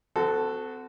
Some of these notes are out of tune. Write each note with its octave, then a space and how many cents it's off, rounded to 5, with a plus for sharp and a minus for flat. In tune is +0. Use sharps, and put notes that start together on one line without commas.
C4 -35 F#4 +0 A4 +0